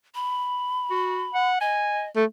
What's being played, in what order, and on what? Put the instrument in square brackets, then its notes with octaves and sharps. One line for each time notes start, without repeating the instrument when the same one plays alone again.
[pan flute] B5
[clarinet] F#4
F#5
[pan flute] D#5 [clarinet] G#5
[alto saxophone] A3